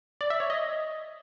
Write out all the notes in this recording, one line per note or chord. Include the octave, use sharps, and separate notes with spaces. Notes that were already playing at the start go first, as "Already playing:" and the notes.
D5
E5
C#5
D#5